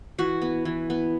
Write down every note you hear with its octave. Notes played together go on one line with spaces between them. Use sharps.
E3 F#4
B3
E3
B3